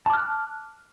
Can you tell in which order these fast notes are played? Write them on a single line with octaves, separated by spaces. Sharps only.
A5 D6 F6 F#6